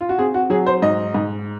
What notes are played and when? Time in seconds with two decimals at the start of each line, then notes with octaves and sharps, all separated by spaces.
0.01 F4
0.09 F#4
0.19 C4 G#4
0.34 F#4
0.50 F#3 G#4
0.66 C5
0.82 G#2 D#5
1.14 G#2